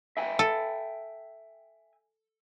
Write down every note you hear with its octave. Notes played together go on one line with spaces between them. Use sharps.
E5 G5 G#5
A4